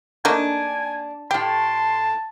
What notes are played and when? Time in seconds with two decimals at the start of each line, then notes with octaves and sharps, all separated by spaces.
0.25 A3 A#3 D4 D#4 G#5
1.31 A2 G4 G5 A5 C6